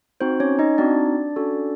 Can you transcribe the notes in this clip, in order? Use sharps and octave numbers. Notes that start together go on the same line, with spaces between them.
C4 D#4 F#4 C5
C#4 C#5
D#4 D#5
C4 D4 D#4 F#4 D5
C#4 F#4 A4